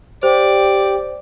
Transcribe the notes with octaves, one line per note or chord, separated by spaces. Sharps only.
G4 C5 D5